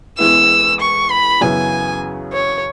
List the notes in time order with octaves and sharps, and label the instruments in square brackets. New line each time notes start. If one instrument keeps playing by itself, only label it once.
[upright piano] E2 E3 G#3 B3 E4 [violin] E6
[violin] C#6
B5
[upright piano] F#2 C#3 E3 B3 E4 [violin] G#5
[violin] C#5